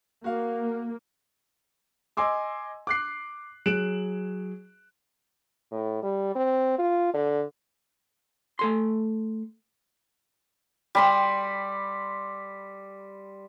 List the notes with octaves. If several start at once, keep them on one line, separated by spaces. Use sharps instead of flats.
A#3 F#4 F5
D#5 G#5 C6 D6 E6
D6 F#6 C7
F#3 G#4 F#6 D7 E7 F#7
A2
G3
C4
F4
D3
A3 A4 C6
G3 B5 C6